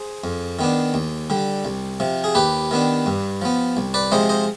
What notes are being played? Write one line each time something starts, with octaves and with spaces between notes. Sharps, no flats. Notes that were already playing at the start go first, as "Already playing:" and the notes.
Already playing: G#4 C5
F2
D#3 B3 D4
D#2
D3 G3
C2
C3 F3
G#4
D#2 G4 B4
D#3 B3 D4
G2
F3 B3
C2
B4 D5
C3 F3 G#3 C5 D#5
C5 D#5